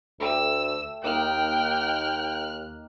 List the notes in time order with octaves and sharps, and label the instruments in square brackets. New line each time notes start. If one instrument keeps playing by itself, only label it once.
[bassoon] D2 [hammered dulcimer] A3 G4 A5 [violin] E6
[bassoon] D#2 [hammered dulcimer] A#3 D#4 G4 [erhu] G5 [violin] F6 F#6